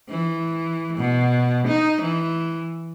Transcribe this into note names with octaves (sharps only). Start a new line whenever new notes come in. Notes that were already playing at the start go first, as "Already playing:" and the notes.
E3
B2
D#4
E3